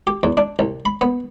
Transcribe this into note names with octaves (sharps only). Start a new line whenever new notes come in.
G4
E2
D4
C2
B5
B3